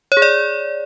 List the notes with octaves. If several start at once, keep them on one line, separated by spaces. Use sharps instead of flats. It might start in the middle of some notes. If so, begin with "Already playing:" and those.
C#5
G#4
D5